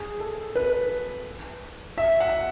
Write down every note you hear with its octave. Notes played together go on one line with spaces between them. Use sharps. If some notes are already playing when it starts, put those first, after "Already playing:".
Already playing: G#4
A4
B4
E5
F#5